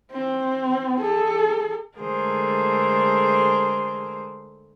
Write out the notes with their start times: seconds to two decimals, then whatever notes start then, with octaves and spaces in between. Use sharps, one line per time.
0.12 C4
1.01 G#4 A4
1.97 D3 G#3 A3 G#4 A#4 C5